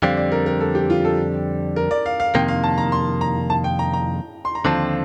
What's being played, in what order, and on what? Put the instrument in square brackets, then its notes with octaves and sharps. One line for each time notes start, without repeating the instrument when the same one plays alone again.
[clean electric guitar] F2 D3 G3 C4 [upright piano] F5
[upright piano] D5
A#4
A#4
A4
G4
F4
A4
A#4
D5
F5
F5
[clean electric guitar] F2 C3 D#3 A#3 [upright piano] G5
[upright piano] F5
A5
A#5
C6
A#5
A5
G5
A#5
A#5
C6
A#5
[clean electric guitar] D#2 D3 F3 C4 F4 [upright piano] A5